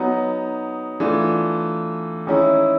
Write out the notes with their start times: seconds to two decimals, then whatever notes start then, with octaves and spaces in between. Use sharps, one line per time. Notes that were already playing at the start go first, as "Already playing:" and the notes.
Already playing: F#3 B3 D#4
1.00 E3 A3 D4 F4
2.27 D#3 G#3 C#4 E4